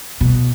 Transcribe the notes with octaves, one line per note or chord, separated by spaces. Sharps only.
B2